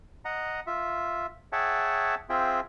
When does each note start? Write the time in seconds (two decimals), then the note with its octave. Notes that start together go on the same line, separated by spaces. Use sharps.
0.25 D#5 F#5 A#5
0.67 F4 E5
1.52 G#4 C#5 E5 F#5 G5 A5
2.30 C4 F4 G#4 E5 G5